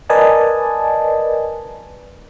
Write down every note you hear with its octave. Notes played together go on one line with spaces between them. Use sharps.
A#4 B4 D5 D#5 G#5 A5